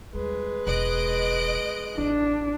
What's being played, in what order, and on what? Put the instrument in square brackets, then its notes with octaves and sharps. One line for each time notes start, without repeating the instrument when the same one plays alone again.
[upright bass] D#2 G3 [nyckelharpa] G#3 B4
[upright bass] E1 [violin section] D#5 F#6 D7
[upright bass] A1 D#4 [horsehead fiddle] D4